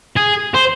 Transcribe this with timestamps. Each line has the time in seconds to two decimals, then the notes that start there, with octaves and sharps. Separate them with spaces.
0.16 G#4
0.54 C5